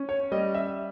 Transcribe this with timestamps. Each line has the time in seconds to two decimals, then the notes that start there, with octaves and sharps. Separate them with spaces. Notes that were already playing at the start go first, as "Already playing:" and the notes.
Already playing: C#4
0.09 C#5
0.32 G3 D#5
0.55 E5